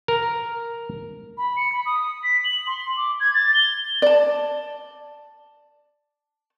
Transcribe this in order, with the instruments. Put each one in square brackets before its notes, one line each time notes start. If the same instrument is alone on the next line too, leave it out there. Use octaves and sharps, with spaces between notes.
[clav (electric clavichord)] A#4
[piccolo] B5
C#7
B5
D#6
B6
F#7
C6
D6
G#6
A6
G7
[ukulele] D5 A5